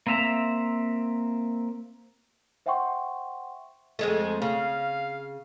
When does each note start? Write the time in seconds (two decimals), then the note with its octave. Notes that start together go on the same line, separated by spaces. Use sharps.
0.07 A#3 C4 E5 A#5
2.66 C5 E5 F#5 G5 C6 C#6
3.99 F2 G#3 A3
4.42 C#3 F5